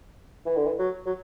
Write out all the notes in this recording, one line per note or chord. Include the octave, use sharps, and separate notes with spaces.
E3
D3
E3
F#3
F#3